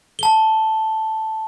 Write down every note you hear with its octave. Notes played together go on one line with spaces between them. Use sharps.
A5 G7